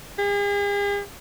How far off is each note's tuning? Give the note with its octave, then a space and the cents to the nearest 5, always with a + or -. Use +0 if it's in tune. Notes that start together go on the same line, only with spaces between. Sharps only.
G#4 -45